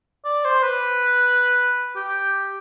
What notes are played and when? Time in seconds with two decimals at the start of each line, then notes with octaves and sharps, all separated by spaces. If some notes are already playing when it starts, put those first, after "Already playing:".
0.25 D5
0.44 C5
0.63 B4
1.96 G4